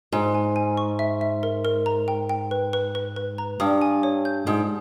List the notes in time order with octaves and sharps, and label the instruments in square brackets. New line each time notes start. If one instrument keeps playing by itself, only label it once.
[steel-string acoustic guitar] G#2 [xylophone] G#5
[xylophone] G#5
G#5
C#6
E5
E5
A#4
A#4
A#5
G5
G5
B4
B4
B4
B4
A#5
[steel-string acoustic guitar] G2 [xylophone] D#6
[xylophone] G#5
C#5
G6
[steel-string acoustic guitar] G#2 [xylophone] D#6